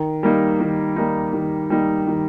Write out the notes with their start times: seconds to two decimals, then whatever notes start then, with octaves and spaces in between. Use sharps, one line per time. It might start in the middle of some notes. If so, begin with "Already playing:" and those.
Already playing: D#3
0.23 G3 A#3 D#4
0.60 D#3
0.96 G3 A#3 D#4
1.33 D#3
1.70 G3 A#3 D#4
2.07 D#3